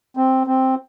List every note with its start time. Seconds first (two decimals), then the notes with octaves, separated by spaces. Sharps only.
0.17 C4
0.47 C4